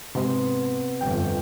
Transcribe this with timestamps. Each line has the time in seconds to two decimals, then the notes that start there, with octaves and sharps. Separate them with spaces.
0.15 G#2 C3 B3 C6
1.01 G1 F2 G5